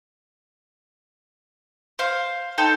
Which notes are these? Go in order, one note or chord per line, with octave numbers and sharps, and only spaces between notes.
C5 F5
D#4 A4 G5 C6